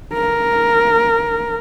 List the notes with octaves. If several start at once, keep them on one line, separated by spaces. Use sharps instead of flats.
A#4